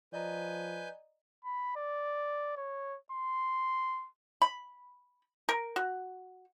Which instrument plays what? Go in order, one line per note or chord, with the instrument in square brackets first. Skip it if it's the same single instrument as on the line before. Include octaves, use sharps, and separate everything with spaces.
[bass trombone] F3 [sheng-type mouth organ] B4 G#5 G6 [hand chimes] D5 D#5 A#5
[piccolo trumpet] B5
D5
C#5
C6
[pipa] B5
A#4
F#4